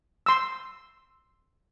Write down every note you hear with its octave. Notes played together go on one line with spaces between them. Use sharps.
C6 E6